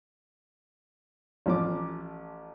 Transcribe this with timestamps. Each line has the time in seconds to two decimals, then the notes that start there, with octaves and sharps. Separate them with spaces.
1.46 A1 F3 D6